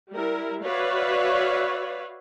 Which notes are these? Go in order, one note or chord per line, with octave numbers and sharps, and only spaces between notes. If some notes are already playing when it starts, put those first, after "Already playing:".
G3 E4 A#4
F#4 B4 C#5 D5 E5 F5